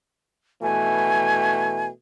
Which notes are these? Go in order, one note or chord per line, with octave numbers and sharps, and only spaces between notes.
B2 E3 A3 G#5